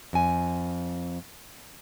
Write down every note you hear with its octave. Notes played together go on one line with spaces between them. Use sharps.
F2 G#5